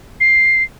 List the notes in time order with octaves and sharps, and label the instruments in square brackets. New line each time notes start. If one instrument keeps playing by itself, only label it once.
[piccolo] C7